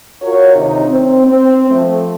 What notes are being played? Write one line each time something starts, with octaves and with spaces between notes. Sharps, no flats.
F4 F#4 A#4 C#5
D2 C3 D#3 D#4
C4
C4
F3 A3